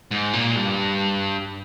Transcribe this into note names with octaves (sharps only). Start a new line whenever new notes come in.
G#2
A#2
G2